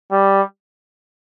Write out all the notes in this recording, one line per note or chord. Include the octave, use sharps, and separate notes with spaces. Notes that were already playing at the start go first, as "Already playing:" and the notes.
G3